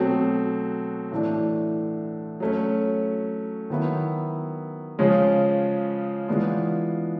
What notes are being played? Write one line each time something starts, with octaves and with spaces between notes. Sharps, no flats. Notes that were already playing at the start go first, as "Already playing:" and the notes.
Already playing: B2 F#3 A3 C4
A2 E3 A3 D4
F#3 A3 C#4
D#3 F#3 B3 E4
C#3 F3 G#3 C#4 F4
E3 G#3 B3 D4 F4